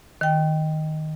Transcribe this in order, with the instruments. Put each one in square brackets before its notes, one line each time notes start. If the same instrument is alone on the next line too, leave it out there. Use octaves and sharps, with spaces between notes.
[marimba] D#3 G5